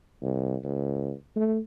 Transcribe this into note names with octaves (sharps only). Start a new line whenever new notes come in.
C2
C#2
A3